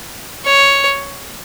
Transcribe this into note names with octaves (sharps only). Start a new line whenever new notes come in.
C#5